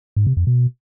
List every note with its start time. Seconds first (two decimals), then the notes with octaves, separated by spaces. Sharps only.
0.17 G#2
0.27 C3
0.37 F2
0.47 B2